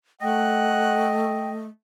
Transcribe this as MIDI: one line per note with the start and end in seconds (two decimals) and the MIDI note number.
0.21 1.67 57
0.21 1.66 75
0.21 1.21 78
0.21 1.51 79